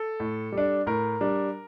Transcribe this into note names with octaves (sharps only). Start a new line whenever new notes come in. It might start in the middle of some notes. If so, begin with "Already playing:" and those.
Already playing: A4
A2
G3
D4
A2 A#4
G3 D4